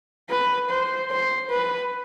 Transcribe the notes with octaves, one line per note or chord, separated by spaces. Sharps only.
B4
C5
C5
B4